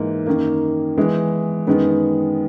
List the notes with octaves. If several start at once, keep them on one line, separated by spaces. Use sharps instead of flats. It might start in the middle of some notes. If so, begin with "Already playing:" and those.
Already playing: G#2 E3 A#3
F#2 D#3 A#3
E3 G#3 B3
F#2 D#3 G#3 B3